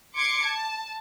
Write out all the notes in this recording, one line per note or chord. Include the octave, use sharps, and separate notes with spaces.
C6 D6 G#6 C#7
A5